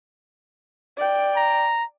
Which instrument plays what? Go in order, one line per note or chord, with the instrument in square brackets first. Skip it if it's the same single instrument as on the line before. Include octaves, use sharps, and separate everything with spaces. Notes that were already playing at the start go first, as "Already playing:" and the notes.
[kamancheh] D5 G5
[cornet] A#5